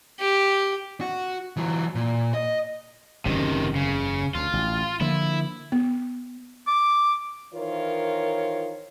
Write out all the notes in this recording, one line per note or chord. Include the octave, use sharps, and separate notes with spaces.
G4
F#4
E3 F#3
A#2
D#5
F#1 E2 C3 D#3 C#4
C#3
D2 F4
A1
D3 F3 A#3 E4
B3
D6
D#3 E3 F4 A#4 C5 C#5